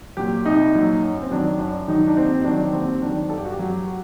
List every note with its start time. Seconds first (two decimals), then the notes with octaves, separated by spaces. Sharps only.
0.17 A#2 F#3 G4
0.45 C2 D#4
0.75 A#2 F#3
1.03 F#2
1.22 C4
1.31 D#3 F#3 D4
1.59 F#2 D4
1.88 D#3 F#3 D#4
2.07 D4
2.16 D#2 C4
2.41 D#4
2.44 D#3 F#3 D4
2.73 D#2 C4
3.02 D#3 F#3 D4
3.30 G2 A4
3.38 G4
3.45 F#4
3.52 G4
3.59 F#3
3.87 F#4